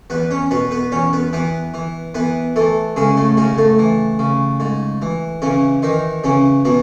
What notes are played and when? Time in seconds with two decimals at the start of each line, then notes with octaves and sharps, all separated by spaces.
0.10 E2 B3 B4
0.31 C#4 C#5
0.51 B2 B3 B4
0.71 B3 B4
0.92 E2 C#4 C#5
1.13 B3 B4
1.33 E3 B3 B4
1.74 E3
2.15 E3 B3 B4
2.56 E3 A3 A4
2.96 C#3 G#3 G#4
3.17 A2 A3
3.37 G#2 C#3 G#3
3.58 A2 A3
3.79 E3
4.19 C#3
4.60 G#2
5.02 E3
5.42 C#3 E3 C#4
5.82 D#3 E3 D#4
6.24 C#3 E3 C#4
6.65 B2 E3 B3